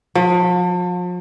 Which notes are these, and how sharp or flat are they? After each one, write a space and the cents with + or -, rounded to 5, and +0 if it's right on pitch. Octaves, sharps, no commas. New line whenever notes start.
F3 +40